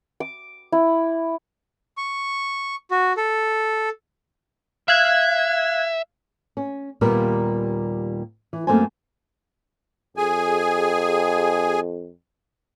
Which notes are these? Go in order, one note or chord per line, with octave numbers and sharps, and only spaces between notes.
D6
E4
C#6
F#4
A4
E5 F5 F#6 G#6
C#4
D#2 A#2 G3 A#3 B3 A#4
E3
F#2 A3 A#3 C4 C5 G#5
F2 G#4 G#5